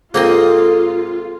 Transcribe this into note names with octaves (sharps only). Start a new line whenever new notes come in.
G#2 A#3 C4 F4 A4 D#5 C6